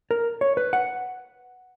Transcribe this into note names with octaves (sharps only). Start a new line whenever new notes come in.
A#4
C#5
B4
F#5